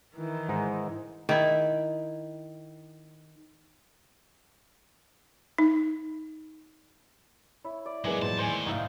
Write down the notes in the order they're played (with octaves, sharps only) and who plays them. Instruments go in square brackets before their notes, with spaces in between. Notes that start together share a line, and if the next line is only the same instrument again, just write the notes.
[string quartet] D#3 E3
[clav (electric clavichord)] G#2 G#3 D#4
[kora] D#3 E4
[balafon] D#4
[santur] E4 [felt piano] C#5
[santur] D5
[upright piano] E2 G#3 B3 [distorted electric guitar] F#3 [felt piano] D#5 G#5 D6
[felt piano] A#2 F#3 [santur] C5 [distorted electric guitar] A5
[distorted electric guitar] A2 [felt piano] D#3 [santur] C5 G#5
[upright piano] C2 [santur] D#4 E5 F5